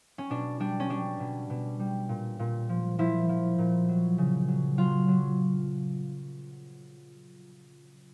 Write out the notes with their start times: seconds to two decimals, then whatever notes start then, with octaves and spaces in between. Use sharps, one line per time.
0.18 C#4
0.30 B2 D4
0.60 G3 D4
0.80 C#4
0.90 G3 D4
1.20 B2
1.50 B2
1.79 G3
2.09 A#2
2.39 A#2
2.69 F3
2.99 F3 E4
3.29 F3
3.58 A#2
3.89 F#3
4.18 C#3
4.48 F#3
4.78 F#3 F4
5.08 F#3